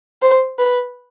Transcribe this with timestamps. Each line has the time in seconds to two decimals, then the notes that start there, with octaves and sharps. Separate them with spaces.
0.22 C5
0.59 B4